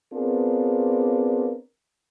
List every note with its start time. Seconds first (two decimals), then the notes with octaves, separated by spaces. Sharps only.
0.14 B3 C4 D4 F4 G#4 A#4